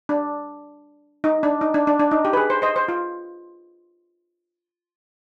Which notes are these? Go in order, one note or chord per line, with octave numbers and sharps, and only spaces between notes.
D4
D#4
D4
D#4
D4
D4
D4
D#4
G4
B4
G#4
C5
C5 D#5
C5
F4